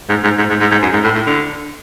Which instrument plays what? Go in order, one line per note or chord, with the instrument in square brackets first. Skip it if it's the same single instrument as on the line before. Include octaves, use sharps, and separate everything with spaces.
[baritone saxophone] G#2
G#2
G#2
G#2
G#2
G#2
F#2
G#2
A2
A2
D3